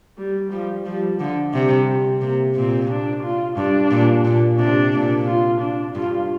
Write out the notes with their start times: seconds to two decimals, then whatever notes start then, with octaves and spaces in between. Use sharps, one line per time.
0.18 G3
0.52 F3 G3
0.86 F3 G3
1.19 D3 F3
1.54 C3 G3
2.21 C3 A#3
2.55 A#2 C4
2.90 D4
3.23 F4
3.57 G2 D4
3.91 A#2
4.25 A#2
4.58 C3 D4
4.93 A#2
5.26 F4
5.61 D4
5.95 G2 F4